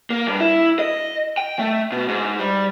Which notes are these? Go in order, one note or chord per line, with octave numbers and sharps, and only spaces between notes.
A#3
G2
E4
D#5
G5
A3
B2
G#2
G3